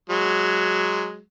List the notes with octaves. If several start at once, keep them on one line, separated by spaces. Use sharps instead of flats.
F#3 G#3